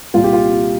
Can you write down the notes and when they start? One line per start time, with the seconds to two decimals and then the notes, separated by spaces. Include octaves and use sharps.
0.14 C2 A#2 F4
0.24 G4
0.33 F4